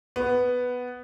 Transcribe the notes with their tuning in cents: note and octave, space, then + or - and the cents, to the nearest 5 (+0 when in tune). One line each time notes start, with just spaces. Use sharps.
B3 +5